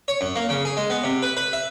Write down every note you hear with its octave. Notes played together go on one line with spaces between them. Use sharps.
C#5
F#2
A#3
C#3
G#4
G#3
B3
C3
B4
B4
E5